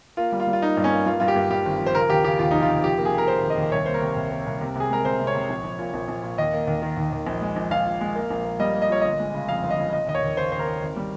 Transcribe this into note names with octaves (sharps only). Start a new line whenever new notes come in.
A#3 F4
G3
F4
G3
F4
A#3 D#4
G2
C#4
A#3
G2 F4
G2 F4
G4
G2
G2 G4
G#1
F3
C5
C#3 A#4
D#2 G4
C#3 G4
D#2 F4
F1 D#4
F4
F1
F3 G4
A#3
G#4
A#3 A#4
A#3 C5
D#2
D#5
D#2
C2 C#5
A#3 C5
A#4
C3
C2
A#3
C2
C3
C3 G#4
G#3 A#4
C3 C5
C3
C#5
C3
A#1
A#1
A#2
A#1
A#1
A#2
D#2 D#5
A#3
D#2
D#3
D#2
D#2
A#1
G#3
A#1
A#1 F5
A#2
G#3
A#3
A#1
A#3
G3 D#5
A#3
D#5
A#2 C#5
G1 D#5
G#3
C#3
F2 F5
G1
D#5
C#3
C#3 D#5
D#2 D#5
C#5
D#2
C#3 C5
D#2 C5
A#4
D#2
G#1
G3